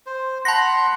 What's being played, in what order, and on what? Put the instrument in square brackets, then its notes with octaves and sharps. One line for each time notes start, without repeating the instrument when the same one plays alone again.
[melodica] C5
[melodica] F#5 B5 C6 [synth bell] A5 A#6